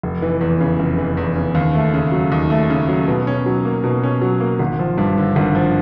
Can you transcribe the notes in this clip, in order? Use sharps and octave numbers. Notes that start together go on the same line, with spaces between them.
F1
E3
E2
C#3
F1
E3
E2
C#3
D#2
A3
C#3
F#3
D#2
A3
C#3
F#3
B2
C#4
F#3
A#3
B2
C#4
F#3
A#3
G#1
F3
G2
D3
G#1
F3